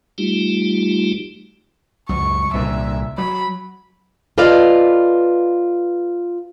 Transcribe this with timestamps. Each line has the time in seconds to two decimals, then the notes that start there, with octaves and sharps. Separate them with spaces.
0.18 G3 A3 D#4 F4 G4
2.09 C#2 F#2 C#6
2.53 C2 A#2 D3 E5
3.18 F#3 B5
4.38 F4 A4 B4 D5 D#5 F5